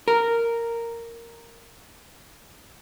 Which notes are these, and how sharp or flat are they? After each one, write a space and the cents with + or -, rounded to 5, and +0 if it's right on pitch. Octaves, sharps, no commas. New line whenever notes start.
A#4 -5